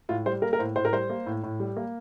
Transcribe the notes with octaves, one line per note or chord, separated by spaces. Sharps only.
A2 F4
G3 C5
A#3 A#4
A#4
A2 C5
A2 C5
A#4
G3 C5
A#3
A2
A2
G3
A#3